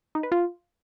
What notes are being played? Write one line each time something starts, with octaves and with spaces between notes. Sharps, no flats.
D#4
B4
F4